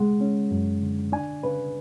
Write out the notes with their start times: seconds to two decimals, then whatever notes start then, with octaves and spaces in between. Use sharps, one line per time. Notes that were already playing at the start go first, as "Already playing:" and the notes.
Already playing: C#2 C#3 G#3 F#5
0.21 C#4
0.51 F#2
0.83 D3
1.12 D4 G#5
1.43 C#3 B4